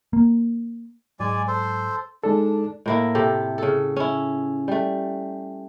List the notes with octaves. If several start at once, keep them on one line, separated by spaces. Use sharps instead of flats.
A#3
G#2 F#3 G#3 D5 G#5
A4 C5 C6
G#3 D4 D#4 A4
A2 A#3 E4
C3 G4 A4
C#3 A4
C#4 E4
G3 A3